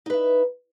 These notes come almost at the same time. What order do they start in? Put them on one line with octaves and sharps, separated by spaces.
D#4 B4 E5